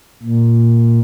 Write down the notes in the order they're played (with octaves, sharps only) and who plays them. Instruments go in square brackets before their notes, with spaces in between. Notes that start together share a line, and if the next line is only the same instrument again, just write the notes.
[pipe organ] A#2